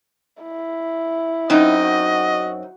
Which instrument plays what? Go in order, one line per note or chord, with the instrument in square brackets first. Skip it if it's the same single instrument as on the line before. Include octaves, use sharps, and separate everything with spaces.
[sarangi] E4
[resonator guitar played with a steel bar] F#2 C4 D#4 [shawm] D#5
[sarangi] F#4